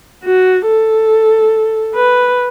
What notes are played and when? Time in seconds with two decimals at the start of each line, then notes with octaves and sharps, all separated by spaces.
0.24 F#4
0.67 A4
1.95 B4